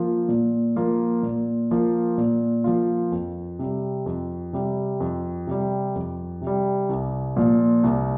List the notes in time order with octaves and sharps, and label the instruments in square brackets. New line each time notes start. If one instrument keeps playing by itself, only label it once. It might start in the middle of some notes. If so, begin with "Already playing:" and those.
Already playing: [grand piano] F3 A#3 F4
A#2
F3 A#3 F4
A#2
F3 A#3 F4
A#2
F3 A#3 F4
F2
C3 G3
F2
C3 G3
F2
C3 G3
F2
C3
G3
C2
A#2 F3
C2